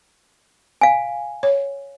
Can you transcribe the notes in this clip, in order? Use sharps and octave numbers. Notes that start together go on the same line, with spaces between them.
F5 G#5
C#5